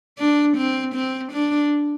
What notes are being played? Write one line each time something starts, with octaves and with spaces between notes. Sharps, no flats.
D4
C4
C4
D4